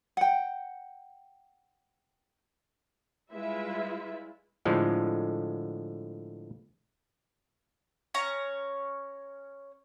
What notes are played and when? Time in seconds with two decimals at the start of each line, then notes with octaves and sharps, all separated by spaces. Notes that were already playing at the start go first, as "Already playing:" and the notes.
0.17 F#5 G5
3.31 G3 G#3 E4 F4 B4 E5
4.65 A2 D3 F3 G#3
8.14 C#4 C#5 A#5